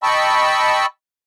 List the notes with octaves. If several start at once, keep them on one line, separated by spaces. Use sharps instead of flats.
D#5 G5 A5 B5 C#6 E6